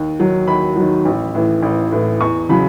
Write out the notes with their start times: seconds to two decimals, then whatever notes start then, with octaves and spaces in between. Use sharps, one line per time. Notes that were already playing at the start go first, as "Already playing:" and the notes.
Already playing: D#2
0.19 D#3 F#3
0.47 D#2 B5
0.76 D#3 F#3
1.05 A1
1.35 A2 E3
1.62 A1
1.92 A2 E3
2.20 E2 C#6
2.49 C#3 F#3 B5